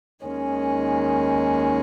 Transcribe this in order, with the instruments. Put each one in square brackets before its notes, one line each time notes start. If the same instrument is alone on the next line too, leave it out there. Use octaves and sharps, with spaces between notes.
[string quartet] D#2 D#3 G#3 C#4